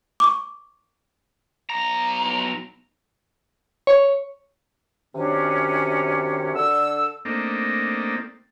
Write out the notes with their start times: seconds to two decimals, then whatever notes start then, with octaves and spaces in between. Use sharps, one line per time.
0.20 C#6 D6
1.70 B1 A#5
3.87 C#5
5.14 F#2 C3 D#3 C#4 D4
6.54 D3 E6
7.25 A3 A#3 C4 D4 D#4